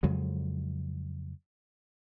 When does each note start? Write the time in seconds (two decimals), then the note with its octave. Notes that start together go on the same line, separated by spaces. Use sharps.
0.03 F2 C#3 F#3 G#3